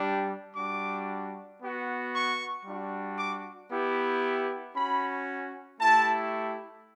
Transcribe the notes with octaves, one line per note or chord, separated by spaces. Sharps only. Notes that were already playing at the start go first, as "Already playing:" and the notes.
Already playing: G3 D4 G4
G3 D4 F#4 D6
B3 F#4
C#6
G3 D4 F#4
D6
B3 E4 G4
C#4 F#4 B5
A3 E4 G4 A5